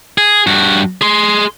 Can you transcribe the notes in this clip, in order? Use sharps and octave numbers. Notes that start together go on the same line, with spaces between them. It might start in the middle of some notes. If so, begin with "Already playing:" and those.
G#4
G2 F#4
G#4 C6